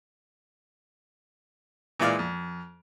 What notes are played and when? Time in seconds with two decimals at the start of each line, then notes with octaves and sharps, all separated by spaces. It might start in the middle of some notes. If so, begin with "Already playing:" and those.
2.00 A#2 E3 G#3 D5 F5 F6
2.19 F2